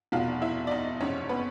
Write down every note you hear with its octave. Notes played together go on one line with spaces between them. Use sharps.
F1 E2 B2 F4 F5
E4 E5
D5
D#4 D#5
F#1 F2 C3 C#4 C#5
B3 B4